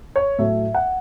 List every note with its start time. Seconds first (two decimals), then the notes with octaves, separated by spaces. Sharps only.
0.16 C#5
0.38 A2 F#3 A3 E5
0.75 F#5